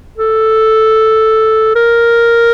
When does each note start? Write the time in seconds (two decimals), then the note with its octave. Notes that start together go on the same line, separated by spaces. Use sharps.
0.18 A4
1.75 A#4